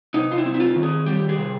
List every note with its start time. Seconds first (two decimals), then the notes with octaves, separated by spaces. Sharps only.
0.14 C3 D#4
0.32 F4
0.38 E4
0.46 C4
0.54 E4
0.60 F4
0.76 D#3
0.83 G#4
1.06 G3 G4
1.29 G#4
1.37 C3